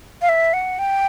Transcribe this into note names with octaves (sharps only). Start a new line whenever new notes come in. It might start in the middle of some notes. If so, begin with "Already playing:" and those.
F5
E5
F#5
G5